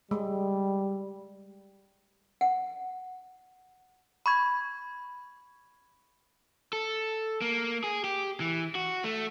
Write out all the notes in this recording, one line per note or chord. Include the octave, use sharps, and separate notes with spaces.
G3 G#3
F#5
B5 C#6 G#6
A4
A#3
G#4
G4
E3
F#4
A3